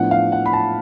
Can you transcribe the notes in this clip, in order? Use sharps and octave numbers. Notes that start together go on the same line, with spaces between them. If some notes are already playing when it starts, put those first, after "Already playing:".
Already playing: A2 F3 B3 D4 F#5
F5
F#5
B5
A5